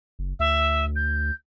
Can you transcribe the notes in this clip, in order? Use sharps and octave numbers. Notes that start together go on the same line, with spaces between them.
F#1
D2 E5
G6